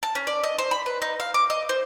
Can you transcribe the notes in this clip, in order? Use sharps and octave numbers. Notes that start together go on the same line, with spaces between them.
A5
C#4
D5
D#5
C5
B5
B4
D#4
F5
D6
D#5
C5